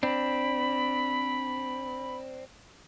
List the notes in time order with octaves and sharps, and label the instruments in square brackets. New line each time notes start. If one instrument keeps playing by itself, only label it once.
[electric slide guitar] C4 D4 [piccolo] B5